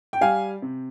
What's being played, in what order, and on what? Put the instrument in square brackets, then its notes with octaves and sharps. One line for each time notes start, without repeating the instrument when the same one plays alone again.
[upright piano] G5
G3 F5 G#5
C3